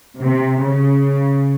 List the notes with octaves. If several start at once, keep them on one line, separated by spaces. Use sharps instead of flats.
C3
C#3